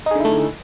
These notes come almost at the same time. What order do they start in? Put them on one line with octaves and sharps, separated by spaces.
D#4 G#4 D3 E4 A3